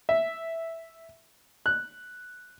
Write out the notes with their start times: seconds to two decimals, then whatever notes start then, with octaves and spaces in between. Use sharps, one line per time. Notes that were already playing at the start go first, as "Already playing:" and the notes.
0.09 E5
1.66 F#6